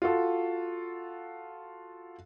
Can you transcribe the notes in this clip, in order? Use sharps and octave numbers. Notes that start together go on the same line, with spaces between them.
F4 F#4 A4